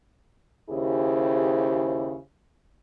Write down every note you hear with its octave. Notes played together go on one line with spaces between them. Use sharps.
D#2 C#3 E4 G4 G#4 C5